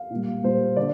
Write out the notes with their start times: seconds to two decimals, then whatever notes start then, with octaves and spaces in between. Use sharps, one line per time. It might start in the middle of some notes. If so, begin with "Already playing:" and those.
Already playing: F5
0.10 A#2
0.16 G3
0.43 A#2 G3 C5
0.76 D3 D5